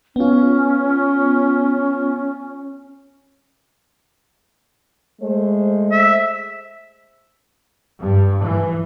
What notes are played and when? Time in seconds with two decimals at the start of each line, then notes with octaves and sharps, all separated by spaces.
0.16 B3 C#4 F4
5.21 G#3 A3 C5
5.92 E5
8.00 G2
8.44 E3